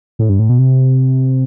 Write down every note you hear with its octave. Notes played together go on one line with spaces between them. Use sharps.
A2
G2
A2
B2
C3